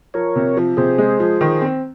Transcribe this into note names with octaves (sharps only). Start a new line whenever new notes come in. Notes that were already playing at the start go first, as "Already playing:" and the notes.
F3 A#4 C#5
C3
F3
C3 G#4 C5
G#3
F3
D#3
C4